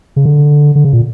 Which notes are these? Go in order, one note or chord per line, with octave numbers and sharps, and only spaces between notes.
C#3
D3
D3
C#3
A#2